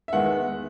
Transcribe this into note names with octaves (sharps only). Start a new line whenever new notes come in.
E5
E2 D#3 G#3 B3 F#5